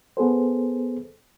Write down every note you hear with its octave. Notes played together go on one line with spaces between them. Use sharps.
B3 G#4 A4 C5